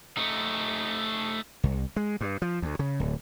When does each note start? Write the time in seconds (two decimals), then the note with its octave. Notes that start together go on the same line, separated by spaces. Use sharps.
0.17 A3 D#4
1.63 C2
1.96 G#3
2.21 G2
2.42 F3
2.62 D2
2.79 C#3
3.00 D1